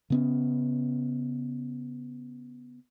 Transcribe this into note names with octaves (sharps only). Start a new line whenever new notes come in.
C#3 B3 C#4